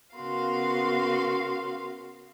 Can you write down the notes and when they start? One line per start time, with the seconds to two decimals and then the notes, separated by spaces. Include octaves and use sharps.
0.15 C#3 B3 F#4 A#4 F5 C6